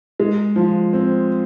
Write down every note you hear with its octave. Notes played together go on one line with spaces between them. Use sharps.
G#3
F3
C4